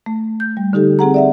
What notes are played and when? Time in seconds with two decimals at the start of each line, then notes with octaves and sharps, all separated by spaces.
0.06 A3
0.40 G6
0.57 G3
0.73 D3 D#4 G4 A4
0.99 C4 G#4 F#5 A#5
1.14 D5 E5 F#5